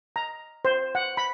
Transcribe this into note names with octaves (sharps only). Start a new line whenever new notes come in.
A#5
C5
F#5
B5